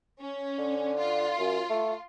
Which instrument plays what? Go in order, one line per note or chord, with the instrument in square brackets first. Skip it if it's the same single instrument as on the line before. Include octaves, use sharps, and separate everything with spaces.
[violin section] C#4
[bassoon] D3
[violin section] F4
[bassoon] F#2
A3